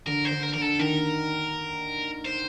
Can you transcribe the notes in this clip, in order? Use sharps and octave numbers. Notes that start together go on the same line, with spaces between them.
D3 A#4
C5
D3
A#4
D3 A#4
A4
D#3 A#4
C5